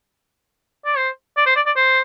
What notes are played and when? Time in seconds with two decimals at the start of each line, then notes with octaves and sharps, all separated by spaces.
0.86 D5
0.97 C5
1.37 D5
1.46 C5
1.56 D5
1.66 D5
1.76 C5